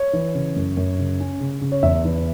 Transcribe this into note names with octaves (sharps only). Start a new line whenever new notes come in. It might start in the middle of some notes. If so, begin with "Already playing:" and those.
Already playing: C#5
E3
C#3
F#2
F#2
C#3
C#4
C#3
C#3
C#5
E2 E5
E3